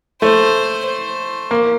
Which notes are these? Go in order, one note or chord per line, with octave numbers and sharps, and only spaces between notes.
A3 C5
C5
A#3